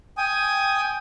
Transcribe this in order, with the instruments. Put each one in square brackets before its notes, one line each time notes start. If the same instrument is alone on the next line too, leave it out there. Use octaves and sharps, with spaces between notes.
[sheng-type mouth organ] G5 G#5 D#6